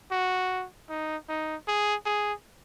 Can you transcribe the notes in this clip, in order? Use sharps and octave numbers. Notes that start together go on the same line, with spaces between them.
F#4
D#4
D#4
G#4
G#4